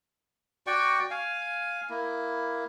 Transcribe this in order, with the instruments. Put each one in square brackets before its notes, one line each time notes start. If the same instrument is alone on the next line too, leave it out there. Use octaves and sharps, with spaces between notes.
[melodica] F#4 D5 G5 C#6
F5 G#5
A#3 E4